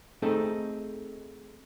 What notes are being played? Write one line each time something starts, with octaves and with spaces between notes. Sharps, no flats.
A3 C4 D#4 G#4 A4